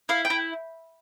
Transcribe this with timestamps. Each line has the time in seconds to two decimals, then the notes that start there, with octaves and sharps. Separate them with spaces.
0.09 E4 F5
0.25 G5
0.30 E4